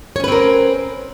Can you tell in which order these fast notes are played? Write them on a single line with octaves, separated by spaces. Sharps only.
C#5 C#4 B4 C4 A#4